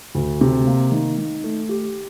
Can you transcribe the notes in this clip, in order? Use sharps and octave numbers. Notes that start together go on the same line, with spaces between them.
D2
C3
A#3
D#3
D#3
A3
G4